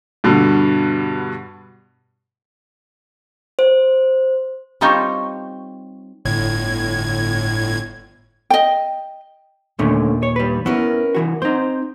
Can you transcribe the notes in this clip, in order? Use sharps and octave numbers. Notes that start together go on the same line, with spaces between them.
G2 B2 D3
C5
G3 C4 D#4 F4 C5 C#5
G1 A2 G#6
D#5 G5
D#2 A#2 D3 A3 C#4
C#5
G3 B4
B3 C#4 E4 A#4 B4
C2 E3 F#4
C4 D#4 C5